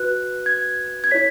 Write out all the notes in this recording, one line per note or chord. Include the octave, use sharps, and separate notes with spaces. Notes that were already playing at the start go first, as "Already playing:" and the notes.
Already playing: F#4 B4 F#6
G#6
G#6
E4 C#5 B6